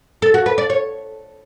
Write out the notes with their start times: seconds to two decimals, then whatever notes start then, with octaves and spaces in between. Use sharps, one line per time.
0.22 A4
0.34 F#4
0.46 B4
0.58 D5
0.70 C#5